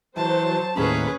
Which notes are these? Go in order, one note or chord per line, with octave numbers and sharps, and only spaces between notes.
E3 F#3 C5 A5
D#2 A2 C#4 G#4 B4 B5